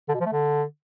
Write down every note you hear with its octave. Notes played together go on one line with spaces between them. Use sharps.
D3
B2
F3
A3
D3